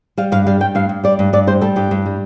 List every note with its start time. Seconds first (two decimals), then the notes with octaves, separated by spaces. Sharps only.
0.18 G3 F5
0.32 G2 F5
0.46 G3 F5
0.61 G3 G5
0.75 G2 F5
0.89 G2
1.04 G3 D5
1.19 G2
1.33 G2 D5
1.47 G3 C5
1.61 G3 A4
1.76 G2 G4
1.91 G2
2.06 G3